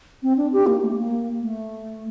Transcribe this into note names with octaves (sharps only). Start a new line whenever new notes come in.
C4
D4
G4
A#3
A3
A#3
A3